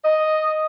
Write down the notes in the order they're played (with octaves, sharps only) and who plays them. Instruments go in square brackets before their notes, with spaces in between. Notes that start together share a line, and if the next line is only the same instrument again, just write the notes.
[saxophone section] D#5